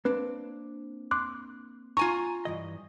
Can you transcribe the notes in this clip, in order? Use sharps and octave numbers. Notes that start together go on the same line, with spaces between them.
A#3 C4 D4 B4
C6 D6 F#6
F4 G#5 A#5 C#6
G2 E3 D#5